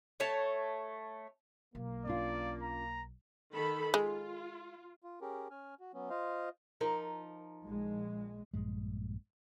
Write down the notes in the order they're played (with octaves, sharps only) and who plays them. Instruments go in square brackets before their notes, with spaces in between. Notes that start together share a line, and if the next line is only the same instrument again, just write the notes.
[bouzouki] A3 C#5 A5
[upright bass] B1 [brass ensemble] A#3
[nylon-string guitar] C#4 D4 F4 [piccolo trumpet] D5
[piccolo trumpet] A#5
[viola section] D#3 A4 B5
[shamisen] G#3 [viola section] F4
[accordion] F4
C#4 G4 G#4 A#4
C#4 G#5 F6
F#4
F#3 B3 C#4
F4 C5 D#5 F5
[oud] F3 D#4 A#4
[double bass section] A#1 G#3
[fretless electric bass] A#1 G2 G#3